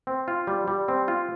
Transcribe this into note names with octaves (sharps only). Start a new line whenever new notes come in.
C4
F4
G3
G3
C4
F4